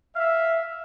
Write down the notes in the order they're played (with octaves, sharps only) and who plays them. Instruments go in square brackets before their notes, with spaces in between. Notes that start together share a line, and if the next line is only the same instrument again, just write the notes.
[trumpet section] E5 [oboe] F5